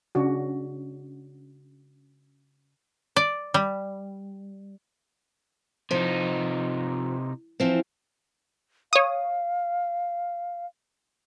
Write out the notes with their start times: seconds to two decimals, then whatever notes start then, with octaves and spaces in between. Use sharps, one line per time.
0.15 C#3 C#4 D4 F#4
3.16 D5
3.54 G3
5.91 C3 F3 D#4
7.60 E3 F3 C4
8.93 C#5 F5 D#6